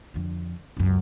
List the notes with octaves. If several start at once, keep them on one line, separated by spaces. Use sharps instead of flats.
F2 D3
C#2 F#2